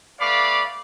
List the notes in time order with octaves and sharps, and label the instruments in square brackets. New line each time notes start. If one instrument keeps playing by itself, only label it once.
[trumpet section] A3 B3 D5 F5 B5 D6